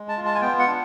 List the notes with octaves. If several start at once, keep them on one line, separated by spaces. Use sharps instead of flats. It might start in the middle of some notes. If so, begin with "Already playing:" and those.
Already playing: G#3
A5
F4
A5
G#5
B3 G5
F#5
D4